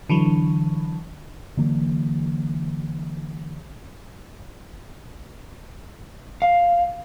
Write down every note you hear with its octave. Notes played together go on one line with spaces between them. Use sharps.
D3 E3 F#3
D3 E3 F#3 A#3
F5